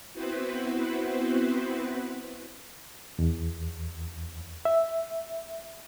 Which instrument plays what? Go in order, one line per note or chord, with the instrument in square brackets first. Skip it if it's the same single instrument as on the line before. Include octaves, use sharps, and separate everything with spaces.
[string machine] B3 C4 E4 F#4 B4 C5
[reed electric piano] E2
E5